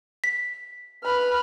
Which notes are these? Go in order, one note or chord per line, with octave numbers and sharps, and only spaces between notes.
B6
B4 B5 F6